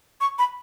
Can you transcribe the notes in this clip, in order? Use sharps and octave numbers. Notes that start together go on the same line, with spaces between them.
C#6
B5